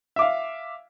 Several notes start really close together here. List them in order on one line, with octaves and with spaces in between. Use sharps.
E5 D6 F5